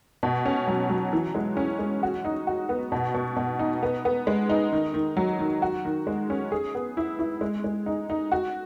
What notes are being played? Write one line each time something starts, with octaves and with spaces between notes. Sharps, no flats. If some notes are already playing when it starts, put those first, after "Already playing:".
B2
C#4
F#3
F#3
E3
G#3
C#4
G#3
F#4
D#4
F#4
B3
B2
B2
B2
D#4
B3
B3
G#3
D#4
D#3
D#3
F#3
D#3
F#4
D#3
G#3
C#4
G#4
B3
E4
E4
G#3
G#3
D#4
D#4
F#4